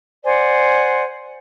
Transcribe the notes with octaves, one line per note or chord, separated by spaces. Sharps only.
C5 D5 F#5 G#5